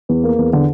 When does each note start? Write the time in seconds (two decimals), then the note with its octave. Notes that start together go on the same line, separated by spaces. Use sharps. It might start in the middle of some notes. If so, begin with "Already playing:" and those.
0.09 E2
0.24 A#3
0.38 E2
0.53 D3